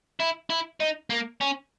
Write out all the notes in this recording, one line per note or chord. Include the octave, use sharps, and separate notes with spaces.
E4
E4
D#4
A#3
C#4